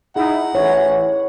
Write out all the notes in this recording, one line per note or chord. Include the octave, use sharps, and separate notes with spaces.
D#4 E4 G#4 F#5
A1 E3 C#5